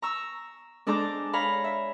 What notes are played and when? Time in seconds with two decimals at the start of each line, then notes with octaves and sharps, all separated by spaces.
0.02 A#5 C#6 E6
0.87 G#3 D4 A4 C5 A#5 D6
1.33 C#5 F5 A#5 B5
1.64 E5